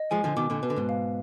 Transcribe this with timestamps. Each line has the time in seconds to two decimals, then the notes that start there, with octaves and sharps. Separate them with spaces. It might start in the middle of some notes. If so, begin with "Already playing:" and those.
Already playing: D#5
0.11 F3 G#3 G#5
0.24 D3 F3
0.36 B2 D#3 D6
0.50 A#2 D3
0.63 B2 B4
0.70 D3
0.76 G#2 B2
0.89 F5